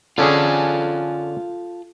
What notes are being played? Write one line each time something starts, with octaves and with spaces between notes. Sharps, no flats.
D3 C#4 F4 G#4 A4